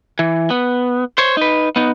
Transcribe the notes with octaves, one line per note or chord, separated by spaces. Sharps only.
E3
B3
C5 C#5
D#4 B4
B3 D#4